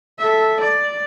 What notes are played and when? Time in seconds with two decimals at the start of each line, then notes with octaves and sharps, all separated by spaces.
0.19 A4 E5
0.60 D5